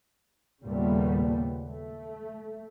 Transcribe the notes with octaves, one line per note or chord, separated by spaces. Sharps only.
D#2 A#2 C#3 G3 A3 B3
A3